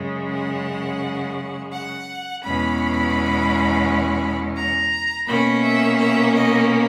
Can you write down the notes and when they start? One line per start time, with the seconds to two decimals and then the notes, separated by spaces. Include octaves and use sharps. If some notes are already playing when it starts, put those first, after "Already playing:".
Already playing: F#2 C#3 G#3
0.30 F#5
1.72 F#5
2.43 E2 B2 G#3 C#4 B5
4.56 A#5
5.27 B2 A#3 C#4 B5
5.62 E5
5.98 E5
6.34 D#5